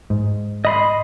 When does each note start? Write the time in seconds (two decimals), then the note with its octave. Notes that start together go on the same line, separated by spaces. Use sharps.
0.10 G#2
0.65 D#5 B5 C6